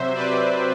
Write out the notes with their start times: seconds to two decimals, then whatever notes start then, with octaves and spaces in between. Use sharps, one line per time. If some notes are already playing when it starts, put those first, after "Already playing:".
Already playing: C3 F#3 C5 E5
0.15 B4 D5